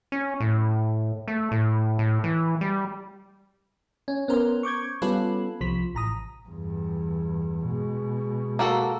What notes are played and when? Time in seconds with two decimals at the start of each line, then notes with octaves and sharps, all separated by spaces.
0.12 C#4
0.40 A2
1.28 A3
1.51 A2
1.99 A2
2.24 E3
2.61 G3
4.08 C#4
4.28 B3 C#4 A#4 C5
4.63 C#6 D6 G6 G#6
5.02 G3 B3 C#4 F4 A4 B4
5.61 C2 F3 B6
5.95 A1 A#5 D#6
6.49 E2 G2
7.68 B2 G#3
8.59 A#3 F#4 A4